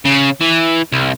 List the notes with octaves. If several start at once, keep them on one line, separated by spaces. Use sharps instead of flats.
C#3
E3
C2